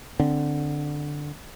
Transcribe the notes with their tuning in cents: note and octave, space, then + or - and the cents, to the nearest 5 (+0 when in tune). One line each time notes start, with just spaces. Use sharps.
D3 +5 C4 +0